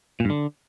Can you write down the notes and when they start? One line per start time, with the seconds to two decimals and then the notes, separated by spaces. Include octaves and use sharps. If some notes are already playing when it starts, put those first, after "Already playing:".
0.20 A#2
0.25 G2
0.30 D3